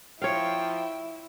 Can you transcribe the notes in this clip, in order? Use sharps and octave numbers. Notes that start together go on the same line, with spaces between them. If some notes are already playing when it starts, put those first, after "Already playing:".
F3 E4 C#5 F5 G5